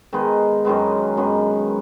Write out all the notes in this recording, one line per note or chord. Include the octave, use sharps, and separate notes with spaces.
D#3 G#3 B3
F#2 D#3 G#3 B3
F#2 D#3 G#3 B3